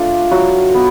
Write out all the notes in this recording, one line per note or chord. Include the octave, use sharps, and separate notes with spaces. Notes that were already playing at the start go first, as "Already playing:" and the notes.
Already playing: A3 D4 F4
F#3 F#4
B3